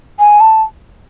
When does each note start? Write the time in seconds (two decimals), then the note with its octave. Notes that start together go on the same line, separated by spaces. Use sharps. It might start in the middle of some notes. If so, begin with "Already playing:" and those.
0.19 G#5
0.40 A5